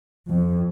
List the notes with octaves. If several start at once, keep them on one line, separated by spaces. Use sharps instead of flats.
F2